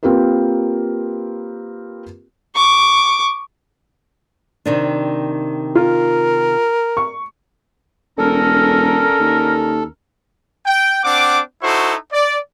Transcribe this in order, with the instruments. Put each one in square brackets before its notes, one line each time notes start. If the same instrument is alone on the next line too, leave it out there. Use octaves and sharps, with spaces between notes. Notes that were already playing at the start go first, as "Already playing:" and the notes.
[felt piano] A#3 C4 F4 G4 A#4 B4
[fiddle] C#6 D6
[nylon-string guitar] C3 D#3 D4
[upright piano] F4 [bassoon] A#4
[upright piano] C#6
[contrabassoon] E1 [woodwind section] D3 C#4 A#4 [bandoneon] A4
[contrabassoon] D#2
[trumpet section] G5
C4 D4 F#5 D6
D#4 E4 F#4 A4 C5 C#6
D5